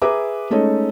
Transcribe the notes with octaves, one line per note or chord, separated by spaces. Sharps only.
G#4 B4 E5 A#5 D6
G#3 A3 C#4 D#4 A4 D#5